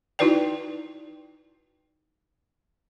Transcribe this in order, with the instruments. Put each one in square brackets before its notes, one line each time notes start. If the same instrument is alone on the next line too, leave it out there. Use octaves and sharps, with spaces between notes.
[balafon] D#4 E4 F#4 B4 D5 G5